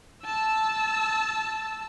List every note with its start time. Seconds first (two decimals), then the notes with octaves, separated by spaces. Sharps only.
0.24 A5 E6